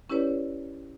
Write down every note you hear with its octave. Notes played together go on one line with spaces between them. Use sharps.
C#4 E4 G4 B4 C#5 D5